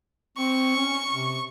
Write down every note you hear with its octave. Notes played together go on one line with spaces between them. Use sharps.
C4 C#6
C#4
C3